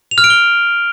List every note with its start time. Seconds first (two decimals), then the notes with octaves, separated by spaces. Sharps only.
0.11 F7
0.18 F6
0.24 D7
0.30 G7